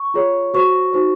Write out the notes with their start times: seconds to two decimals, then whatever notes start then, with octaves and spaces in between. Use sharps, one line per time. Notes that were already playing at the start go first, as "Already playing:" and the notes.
Already playing: C#6
0.14 F4 G#4 C#5
0.54 F#4 C5 C#6
0.93 D#4 F#4 C5